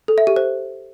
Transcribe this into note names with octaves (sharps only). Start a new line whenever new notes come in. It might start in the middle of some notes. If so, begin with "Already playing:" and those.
A4
E5
G4
C5